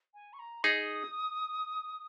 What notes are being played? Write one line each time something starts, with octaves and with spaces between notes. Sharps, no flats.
G#5
C#6
A#5
D#4 G#4 D#6